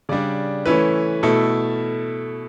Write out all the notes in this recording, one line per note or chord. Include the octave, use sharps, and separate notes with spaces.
C#3 G3 D4 D5
E3 A3 C#4 E4 B4
B2 A3 E4 A4